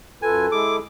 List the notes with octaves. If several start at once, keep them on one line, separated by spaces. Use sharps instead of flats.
F#2 F4 A4 B4 G#5
G#3 E4 G#4 D6